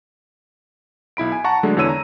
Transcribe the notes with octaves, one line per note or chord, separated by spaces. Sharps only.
B1 E4 B5 D7
G#5
F#5 A5 A#5 C#6
D3 F#3 G#3 A3 D4
E2 D3 E4 C#5 E6 D#7
A#5